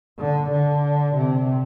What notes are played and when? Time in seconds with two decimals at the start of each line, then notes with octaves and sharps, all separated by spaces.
0.18 D3
0.50 D3
1.15 C3